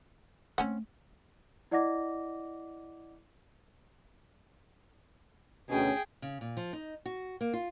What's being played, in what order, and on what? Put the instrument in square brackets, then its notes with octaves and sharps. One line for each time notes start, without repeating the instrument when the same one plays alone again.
[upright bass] A3 A#3 [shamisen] C4 C#4 F#5
[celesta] E4 D5 D#5 F#5 D6 A#6
[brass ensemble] D2 B2 C#4 [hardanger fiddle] G#4 G5
[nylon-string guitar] C#3
A#2
F3
D#4
F#4
A#3
F4